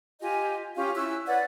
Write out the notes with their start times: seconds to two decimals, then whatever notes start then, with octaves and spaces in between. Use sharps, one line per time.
0.21 F4 G4 D#5 G#5
0.75 C#4 F4 G4 F5
0.95 C#4 E4 E6 F#6
1.25 B4 C#5 D5 F#5